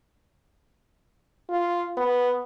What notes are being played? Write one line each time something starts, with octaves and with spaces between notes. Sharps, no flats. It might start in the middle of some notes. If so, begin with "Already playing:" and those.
F4
B3